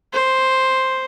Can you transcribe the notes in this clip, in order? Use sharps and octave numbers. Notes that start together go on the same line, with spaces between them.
C5